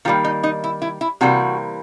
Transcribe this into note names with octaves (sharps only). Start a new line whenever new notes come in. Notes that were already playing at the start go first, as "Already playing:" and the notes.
D#3 G3 A#3 F4
D#4
D#4
E4
E4
E4
C3 E3 G3 A#3 F#4